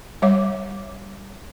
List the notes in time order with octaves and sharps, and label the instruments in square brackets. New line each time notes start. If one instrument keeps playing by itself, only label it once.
[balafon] G3 C#5 E5 D6